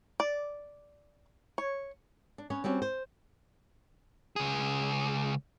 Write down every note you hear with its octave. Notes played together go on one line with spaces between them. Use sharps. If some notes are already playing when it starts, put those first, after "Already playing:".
D5
C#5
D4
B3 C#4 C#5
G3 C4 C#4 F#4
C5
C#2 G#4